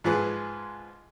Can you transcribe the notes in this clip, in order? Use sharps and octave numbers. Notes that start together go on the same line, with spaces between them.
G#2 F3 G#4 B4